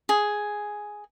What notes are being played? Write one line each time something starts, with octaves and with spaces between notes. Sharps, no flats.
G#4